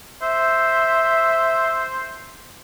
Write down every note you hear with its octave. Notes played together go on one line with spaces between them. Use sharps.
C5 E5